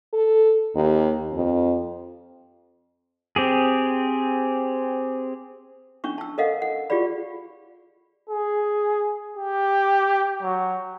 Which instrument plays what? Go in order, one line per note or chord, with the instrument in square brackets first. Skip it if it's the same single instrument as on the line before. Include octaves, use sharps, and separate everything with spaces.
[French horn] A4
D#2
F2
[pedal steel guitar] C4 G4 G#4
[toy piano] C#4 D4 C#6
A5 E6
A4 A#4 D#5 F5 F#5
F#5
F4 G4 G#4 D5 B5
[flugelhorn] G#4
G4
F#3